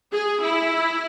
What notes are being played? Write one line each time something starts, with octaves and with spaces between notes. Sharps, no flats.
G#4
E4